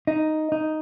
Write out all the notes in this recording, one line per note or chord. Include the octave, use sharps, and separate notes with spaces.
D#4
D#4